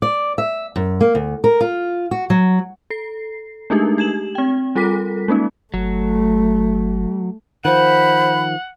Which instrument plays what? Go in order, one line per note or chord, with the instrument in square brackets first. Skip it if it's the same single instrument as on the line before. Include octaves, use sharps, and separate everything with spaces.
[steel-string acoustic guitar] D5
E5
F#2
A#3
D2
A#4
F4
F#4
F#3
[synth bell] A4 C7
G#3 A3 D4 D#4 G4 G#4
G4 G#6 E7 F#7
C4 G5
G3 F4 A4 A#4 D6 B6
G#3 A#3 C#4 D#4
[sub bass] G1 [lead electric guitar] F#3 [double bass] A3
[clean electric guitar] D#3 F3 [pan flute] C5 [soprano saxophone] F#5 [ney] B5